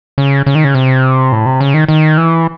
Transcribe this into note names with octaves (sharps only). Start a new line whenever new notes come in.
C#3
C#3
D#3
C#3
C3
A2
C3
C#3
D#3
D#3
E3